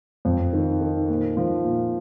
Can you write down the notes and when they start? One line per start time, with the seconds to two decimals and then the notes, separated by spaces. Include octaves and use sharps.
0.25 F2
0.53 D#3
0.81 D#3
1.09 A#2
1.37 F3
1.64 A#2